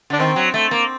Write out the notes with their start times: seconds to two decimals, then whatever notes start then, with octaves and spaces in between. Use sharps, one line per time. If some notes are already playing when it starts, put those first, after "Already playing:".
0.10 D3 D4
0.18 D#3 C4
0.36 F#3
0.54 A3 C4
0.71 A#3